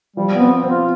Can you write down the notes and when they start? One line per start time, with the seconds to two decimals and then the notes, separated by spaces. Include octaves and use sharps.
0.16 F3 G3
0.35 B3
0.40 C4
0.64 C4
0.69 F4